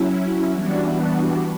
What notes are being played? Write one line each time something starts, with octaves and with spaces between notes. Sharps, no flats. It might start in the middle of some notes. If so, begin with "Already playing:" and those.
Already playing: F#3 C#4 E4
E3 G3 B3 D4 F#4